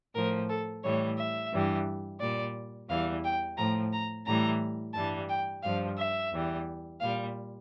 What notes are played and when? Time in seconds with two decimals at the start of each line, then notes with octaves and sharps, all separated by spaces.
0.15 A2 F3 A#4
0.49 A4
0.83 A2 E3 G3 C#5
1.18 E5
1.52 G2 E3 G3
2.20 A#2 G3 D5
2.89 E2 E3 G3 F5
3.23 G5
3.57 A2 F3 A#5
3.92 A#5
4.26 A2 E3 G3 A#5
4.94 G2 E3 G3 A5
5.29 G5
5.63 G2 F3 F5
5.97 E5
6.32 E2 E3 G3
7.00 A#2 G3 F5